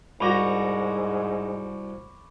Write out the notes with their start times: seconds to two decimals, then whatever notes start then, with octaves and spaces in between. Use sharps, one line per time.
0.21 C2 G#2 F#4 A#5 B5 C#6 D6